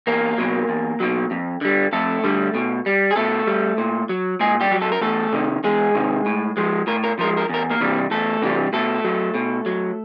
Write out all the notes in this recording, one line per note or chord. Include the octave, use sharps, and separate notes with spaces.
E2 A#3 A#4
B2 F#3
E2
B2 F#3
F2
D3 G3
F2 A3 A4
D3 G3
B2
G3
G#4
B2 A3 A4
G3
A#2
F#3
A#2 G#3 G#4
G3 G4
F#3
A4
A#4
E2 A3 A4
C3 D#3
E2 G#3 G#4
C3 D#3
A2
F3 G#3
A2 A#4
A#4
F3 G#3 A#4
A#4
E2 A#4
A#3 A#4
C3 E3 G3
E2 A3 A4
C3 E3 G3
B2 A3 A4
F#3
B2
F#3